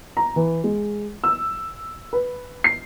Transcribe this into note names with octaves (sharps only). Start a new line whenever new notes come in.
A#5
E3
G#3
E6
B4
C7